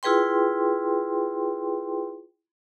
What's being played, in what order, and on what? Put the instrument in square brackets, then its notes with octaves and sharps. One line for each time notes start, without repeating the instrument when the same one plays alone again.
[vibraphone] E4 F4 G#4 B4 G5 C6